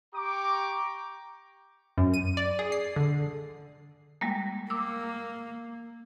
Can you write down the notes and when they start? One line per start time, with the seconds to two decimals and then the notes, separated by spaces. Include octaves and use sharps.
0.14 G4 A#5 C#6 D6
1.98 F#2
2.14 D#7
2.37 D5
2.59 G#4
2.72 C7
2.96 D3
4.21 G3 G#3 A#3
4.70 A#3 D6 E6